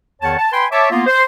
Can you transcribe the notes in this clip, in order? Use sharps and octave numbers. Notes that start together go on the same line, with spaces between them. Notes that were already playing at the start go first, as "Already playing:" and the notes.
E2 D#3 C#5 F#5 A5
A5
B4 G5 G#5 B5 C6
C#5 E5 A5 D6
A#3 B3 F4
C5